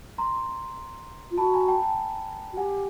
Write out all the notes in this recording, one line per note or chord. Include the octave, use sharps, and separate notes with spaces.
A#5 C6
F4
F#4 A5 B5
G#5 A#5
G5 A5
G5 A5
F#4
G4 F#5 G#5